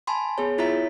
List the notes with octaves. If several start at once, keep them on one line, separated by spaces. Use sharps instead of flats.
G#5 A5 B5 C6
B3 G#4 C#5
E4 F4 C#5 E5 A#5 B6